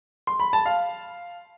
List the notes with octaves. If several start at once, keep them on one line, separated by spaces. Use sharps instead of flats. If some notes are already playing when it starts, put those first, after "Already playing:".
C6
B5
A5
F5